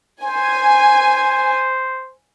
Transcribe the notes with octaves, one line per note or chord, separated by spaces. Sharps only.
C5 G#5